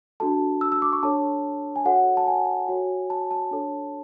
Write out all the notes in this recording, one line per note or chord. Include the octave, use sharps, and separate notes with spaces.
D4 F#4 A4 A5
E6
E6
D6
C#6
D4 A4 C#5 A5
G#5
F#4 A4 C#5 F#5
A5
G#5
F#4 C#5
A5
A5
D4 A4 C#5